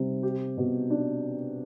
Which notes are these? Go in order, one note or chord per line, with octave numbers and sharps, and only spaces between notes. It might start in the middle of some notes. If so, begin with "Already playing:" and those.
Already playing: C3 G3
G4
B2
D4